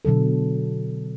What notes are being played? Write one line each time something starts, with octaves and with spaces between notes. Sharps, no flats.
B2 D3 F#3 A4